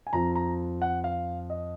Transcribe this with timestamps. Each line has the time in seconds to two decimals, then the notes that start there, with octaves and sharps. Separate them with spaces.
0.07 G#5
0.13 F2 F3 A#5
0.36 A#5
0.82 F#5
1.04 F5
1.50 D#5